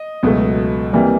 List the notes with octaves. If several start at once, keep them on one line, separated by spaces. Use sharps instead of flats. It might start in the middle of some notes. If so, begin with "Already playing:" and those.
Already playing: D#5
C#2 B2 F#3 A3
C3 E3 G3 A#3